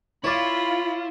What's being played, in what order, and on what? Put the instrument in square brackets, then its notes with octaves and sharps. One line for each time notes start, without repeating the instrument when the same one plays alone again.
[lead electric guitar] E4 [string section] F4 [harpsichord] C#5 D5 [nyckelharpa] B5